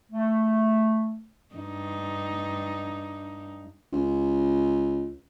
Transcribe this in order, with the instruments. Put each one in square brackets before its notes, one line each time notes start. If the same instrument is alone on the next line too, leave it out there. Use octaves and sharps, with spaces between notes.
[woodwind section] A3
[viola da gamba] G2 D#4
[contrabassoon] C#2